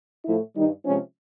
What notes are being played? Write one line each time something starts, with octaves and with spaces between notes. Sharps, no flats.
A2 F3 A3 E4
G2 D#3 G3 D#4
C3 F3 G#3 C#4